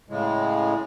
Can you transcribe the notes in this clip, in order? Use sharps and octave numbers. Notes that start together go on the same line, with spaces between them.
A2 C#3 G#3